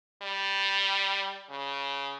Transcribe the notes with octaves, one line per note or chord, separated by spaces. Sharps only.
G3
C#3